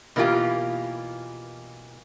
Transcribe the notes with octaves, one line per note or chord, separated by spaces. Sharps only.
B2 E3 A#3 E4 F4 G4